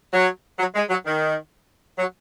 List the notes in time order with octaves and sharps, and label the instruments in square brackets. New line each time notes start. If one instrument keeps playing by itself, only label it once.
[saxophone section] F#3
F#3
G#3
F#3
D#3
F#3